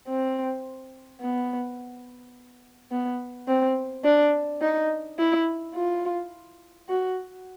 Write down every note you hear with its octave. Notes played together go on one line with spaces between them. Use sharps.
C4
B3
B3
C4
D4
D#4
E4
F4
F#4